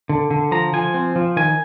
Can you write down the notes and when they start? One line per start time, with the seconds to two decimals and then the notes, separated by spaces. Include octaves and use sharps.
0.09 D3
0.31 D3
0.52 F3 A#5
0.73 F3 G#5
0.94 C4
1.16 F3
1.37 D#3 G#5